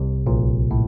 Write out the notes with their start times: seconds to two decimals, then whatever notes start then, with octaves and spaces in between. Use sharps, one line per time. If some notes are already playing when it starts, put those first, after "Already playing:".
Already playing: C2 C3
0.26 A#1 A#2
0.71 A2